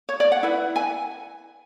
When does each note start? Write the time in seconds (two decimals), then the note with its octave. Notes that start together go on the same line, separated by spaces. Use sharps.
0.09 C#5
0.20 D5
0.32 F#5
0.43 E4 B4
0.76 G#5